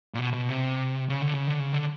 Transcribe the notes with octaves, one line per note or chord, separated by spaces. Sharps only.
A#2
B2
B2
C3
C#3
D3
C#3
D3
C#3
D3